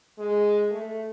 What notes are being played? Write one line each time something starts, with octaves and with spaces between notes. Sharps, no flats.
G#3
A3